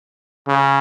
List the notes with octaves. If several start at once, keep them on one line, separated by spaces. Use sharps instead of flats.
C#3